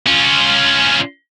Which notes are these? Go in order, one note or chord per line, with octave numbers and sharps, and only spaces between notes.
C#4 F4